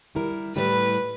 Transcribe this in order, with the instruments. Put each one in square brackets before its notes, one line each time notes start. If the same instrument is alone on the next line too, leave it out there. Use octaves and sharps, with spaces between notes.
[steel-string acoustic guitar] G3 E4 A#4
[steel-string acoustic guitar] A2 G3 E4 [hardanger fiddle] B4